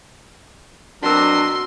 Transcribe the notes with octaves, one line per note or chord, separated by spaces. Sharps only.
B2 F#3 C4 D4 F#4 A#4 C6 E6